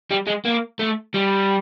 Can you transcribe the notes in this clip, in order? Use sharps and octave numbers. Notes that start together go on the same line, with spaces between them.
G3
G#3
A#3
A3
G3